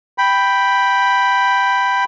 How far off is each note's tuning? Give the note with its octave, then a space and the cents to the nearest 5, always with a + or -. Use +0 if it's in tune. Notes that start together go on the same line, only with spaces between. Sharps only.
G5 +0 B5 +0